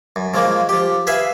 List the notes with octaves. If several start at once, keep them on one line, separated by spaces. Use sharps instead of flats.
F#2
C#3 F3 G#3 A#3
F3 G4
G#4 B4 E5 F5 G#5